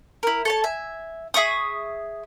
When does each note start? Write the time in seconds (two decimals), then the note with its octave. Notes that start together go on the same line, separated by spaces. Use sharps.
0.23 E4 A#4
0.45 A4 C#5 A5
0.64 E5 G#5
1.34 G#4 E5 C#6 D#6